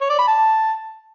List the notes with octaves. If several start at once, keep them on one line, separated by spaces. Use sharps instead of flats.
C#5
D5
B5
A5